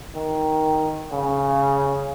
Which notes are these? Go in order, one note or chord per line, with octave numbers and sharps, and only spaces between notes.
D#3
C#3